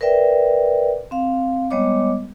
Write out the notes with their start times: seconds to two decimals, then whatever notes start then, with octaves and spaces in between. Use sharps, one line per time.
0.01 A#4 B4 D5 E5 G5
1.11 C4 F5
1.71 G3 G#3 B3 C#5 D#5 D6